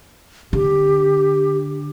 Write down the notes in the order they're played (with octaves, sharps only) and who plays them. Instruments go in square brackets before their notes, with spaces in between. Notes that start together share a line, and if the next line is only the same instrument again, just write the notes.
[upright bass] D3 [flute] G4